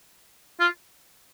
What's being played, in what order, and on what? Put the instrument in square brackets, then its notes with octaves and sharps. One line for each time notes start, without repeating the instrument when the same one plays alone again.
[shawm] F4